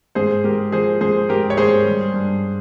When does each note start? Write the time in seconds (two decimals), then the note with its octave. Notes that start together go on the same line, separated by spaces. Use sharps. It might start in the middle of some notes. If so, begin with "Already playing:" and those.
0.15 G#2 G#4 C5
0.44 G#3 G4 A#4
0.72 F3 G#4 C5
1.01 G#3 G#4 C5
1.29 G#2 G4 A#4
1.50 C#5
1.57 G#2 G#4 C5
1.85 G3
2.14 G2